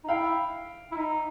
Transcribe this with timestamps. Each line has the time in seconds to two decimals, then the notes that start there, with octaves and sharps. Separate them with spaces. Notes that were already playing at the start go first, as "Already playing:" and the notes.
0.04 D#4
0.08 E4 F5 G5
0.92 E4
0.96 D#4